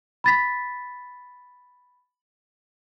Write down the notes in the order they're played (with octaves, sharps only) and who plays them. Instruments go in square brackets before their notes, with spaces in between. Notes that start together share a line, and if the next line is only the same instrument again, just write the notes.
[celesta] B5 A6 B6